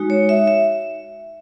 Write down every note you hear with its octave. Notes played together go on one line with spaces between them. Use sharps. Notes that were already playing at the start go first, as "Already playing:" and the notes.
Already playing: G#3 D#4 F#4
C#5
E5
E5